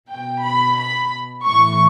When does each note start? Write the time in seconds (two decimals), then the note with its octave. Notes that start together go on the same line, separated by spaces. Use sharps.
0.12 B2 G5
0.46 B5
0.80 B5
1.48 A2 E3 C#6